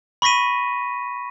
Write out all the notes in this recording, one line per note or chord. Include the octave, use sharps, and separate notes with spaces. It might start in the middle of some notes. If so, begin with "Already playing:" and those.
B5 C#6 A#6 B6 D#7